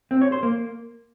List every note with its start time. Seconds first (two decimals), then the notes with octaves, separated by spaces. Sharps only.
0.11 C4
0.21 C#5
0.32 C5
0.43 A#3